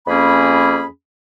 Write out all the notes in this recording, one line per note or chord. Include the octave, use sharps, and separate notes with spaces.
F2 A#3 C#4 G#4 B5